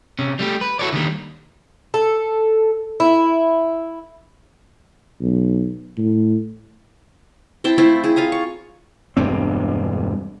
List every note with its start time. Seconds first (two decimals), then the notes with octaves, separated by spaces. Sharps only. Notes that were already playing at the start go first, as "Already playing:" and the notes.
0.19 C3 C#4
0.39 G3 A3 G4
0.61 B4
0.79 E4 F#4 G#4 A4 C#5 D5
0.92 D3 D#3 G3 A#3
1.94 A4
3.00 E4
5.20 B1
5.98 A2
7.64 C4 E4 G5 A5
7.78 A3 C4 E4 F4
8.04 E4 G#4
8.16 F4 F5 G#5 A#5
8.32 C#6
9.17 E1 D2 G2 C4